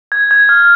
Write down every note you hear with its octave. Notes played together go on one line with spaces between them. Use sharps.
G#6
G#6
F6